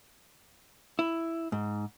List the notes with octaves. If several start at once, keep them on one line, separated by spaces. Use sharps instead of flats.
E4
G#2